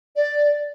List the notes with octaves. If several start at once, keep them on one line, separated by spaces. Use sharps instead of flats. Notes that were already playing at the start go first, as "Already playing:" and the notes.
D5